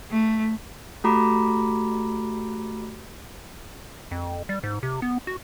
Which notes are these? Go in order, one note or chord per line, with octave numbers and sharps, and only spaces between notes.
A3
A3 F#4 G4 A#5 B5 D6
F2
G3
G#2
C3
B3
F#4